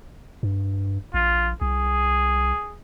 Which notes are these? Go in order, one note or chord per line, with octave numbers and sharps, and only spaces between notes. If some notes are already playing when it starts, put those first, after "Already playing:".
G2
A#1 F4
C2 G#4